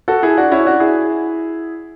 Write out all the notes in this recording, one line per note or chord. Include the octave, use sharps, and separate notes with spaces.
F#4 A4
E4 G#4
D4 F#4
C#4 E4
D4 F#4
E4 G#4